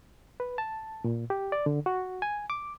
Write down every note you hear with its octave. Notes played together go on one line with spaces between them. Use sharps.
B4
A5
A#2
G4
D5
D3
F#4
G#5
D6